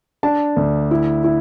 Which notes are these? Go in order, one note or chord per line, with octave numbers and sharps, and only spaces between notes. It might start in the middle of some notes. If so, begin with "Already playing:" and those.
D4 A5
D2
E4
E4